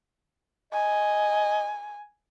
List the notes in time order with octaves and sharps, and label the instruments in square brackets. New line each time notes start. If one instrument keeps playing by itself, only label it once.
[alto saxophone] D#5 [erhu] G#5